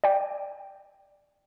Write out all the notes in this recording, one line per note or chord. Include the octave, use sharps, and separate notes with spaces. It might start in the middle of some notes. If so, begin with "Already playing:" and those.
D5 G5